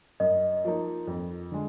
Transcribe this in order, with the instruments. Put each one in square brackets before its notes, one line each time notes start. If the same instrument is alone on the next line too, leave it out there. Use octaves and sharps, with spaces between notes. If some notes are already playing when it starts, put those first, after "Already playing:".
[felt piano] F#2 [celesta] D#5
[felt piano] F3 A#3 D#4
F2
D3 G#3